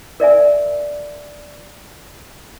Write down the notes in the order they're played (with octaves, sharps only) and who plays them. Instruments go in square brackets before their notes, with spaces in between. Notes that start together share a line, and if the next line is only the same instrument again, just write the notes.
[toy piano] A#4 D5 E5 G#5